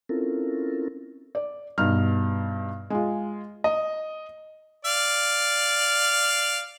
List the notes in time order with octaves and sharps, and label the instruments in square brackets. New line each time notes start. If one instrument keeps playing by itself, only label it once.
[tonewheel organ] C4 C#4 E4 F4 A4 A#4
[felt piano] D5
G2 B2 D#4 F6
G#3 F4
[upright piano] D#5
[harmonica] D5 F5